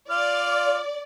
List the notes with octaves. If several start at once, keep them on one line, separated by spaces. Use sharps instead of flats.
F4 D5 F6